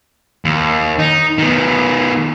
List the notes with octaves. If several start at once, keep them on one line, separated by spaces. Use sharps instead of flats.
D#2
D#4
D#3 B3